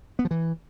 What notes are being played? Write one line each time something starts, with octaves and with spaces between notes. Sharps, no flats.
B3
F3
E3